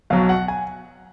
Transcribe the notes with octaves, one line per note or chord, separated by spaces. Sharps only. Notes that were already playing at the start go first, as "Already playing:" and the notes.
B1 B2 F#3 F5
F#5
G#5